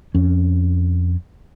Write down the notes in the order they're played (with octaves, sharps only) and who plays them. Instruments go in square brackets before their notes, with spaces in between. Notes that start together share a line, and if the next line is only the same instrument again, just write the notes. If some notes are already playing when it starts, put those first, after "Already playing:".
[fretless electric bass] F2 C#4